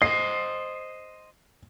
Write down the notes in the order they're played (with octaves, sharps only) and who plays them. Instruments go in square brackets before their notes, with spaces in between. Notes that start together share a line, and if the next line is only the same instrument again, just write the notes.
[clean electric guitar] C5 D#5 [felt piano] C7